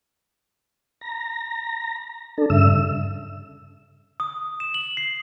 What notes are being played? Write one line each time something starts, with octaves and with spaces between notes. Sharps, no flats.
A#5
D4 A4
G2 C#3 E5 E6
D#6
E7
F#7
C7